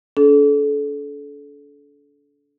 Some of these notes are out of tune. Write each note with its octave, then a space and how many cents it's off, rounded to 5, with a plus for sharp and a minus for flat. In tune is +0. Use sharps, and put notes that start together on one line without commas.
D4 -40 A4 -30